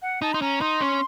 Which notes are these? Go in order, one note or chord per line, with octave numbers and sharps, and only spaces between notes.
F#5
D#4 A5
D#4 C6
C#4 A#5
D#4 C6
C#4